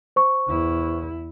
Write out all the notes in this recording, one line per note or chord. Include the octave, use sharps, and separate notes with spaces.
C5 C#6
E2 E4